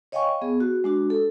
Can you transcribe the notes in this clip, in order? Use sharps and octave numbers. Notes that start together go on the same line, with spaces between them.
C#5 D#5 F5 G5 G#5 C#6
B3 G#4
F#4
G#3 D4 F#4
A4